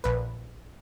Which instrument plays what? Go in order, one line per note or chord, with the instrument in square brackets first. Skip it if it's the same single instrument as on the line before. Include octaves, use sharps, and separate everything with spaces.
[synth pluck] A#1 B4